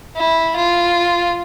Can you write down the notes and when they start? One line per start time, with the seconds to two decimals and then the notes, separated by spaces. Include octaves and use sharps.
0.17 E4
0.57 F4